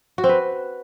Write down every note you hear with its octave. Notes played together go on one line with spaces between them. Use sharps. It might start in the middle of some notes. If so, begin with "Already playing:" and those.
F#4
C4
B4